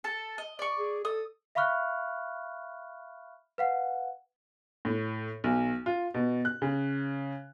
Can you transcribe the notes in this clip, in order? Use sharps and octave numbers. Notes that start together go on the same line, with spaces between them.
A4 A5
D#5
D5 C#6
G#4
A4 D#6
E5 F5 B5 C#6 F6 F#6
B4 F5 F#5
A2
B1
F4
B2
F#6
C#3